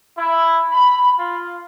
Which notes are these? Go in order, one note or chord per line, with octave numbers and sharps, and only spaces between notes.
E4
B5
F4